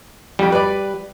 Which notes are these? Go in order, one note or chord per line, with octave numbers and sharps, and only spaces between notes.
F2 G3 G5
B4 D5